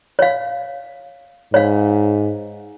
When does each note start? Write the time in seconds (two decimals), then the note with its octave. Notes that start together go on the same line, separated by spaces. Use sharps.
0.19 C#5 F5
1.54 G#2 C#5 F5